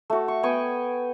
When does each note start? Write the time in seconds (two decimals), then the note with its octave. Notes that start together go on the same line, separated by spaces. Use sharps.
0.10 A3 F#4
0.28 C#6
0.43 B3 G5 G#5 C#6